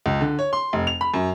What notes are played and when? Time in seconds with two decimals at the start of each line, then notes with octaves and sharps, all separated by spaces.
0.06 C#2
0.21 D3
0.39 C#5
0.53 C6
0.73 F1
0.87 F7
1.01 B5
1.14 F#2